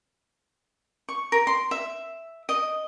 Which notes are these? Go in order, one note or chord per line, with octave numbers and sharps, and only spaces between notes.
C#6
A#4
C6
E5
D#5